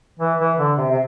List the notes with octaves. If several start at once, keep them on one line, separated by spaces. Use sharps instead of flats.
E3
E3
D3
C3
C3